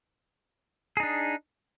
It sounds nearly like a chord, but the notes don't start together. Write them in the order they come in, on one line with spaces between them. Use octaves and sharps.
G#4 D#4 D4